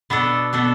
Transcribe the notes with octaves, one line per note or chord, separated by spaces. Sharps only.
B2 B3 D4 A4
B2 B3 D4 A4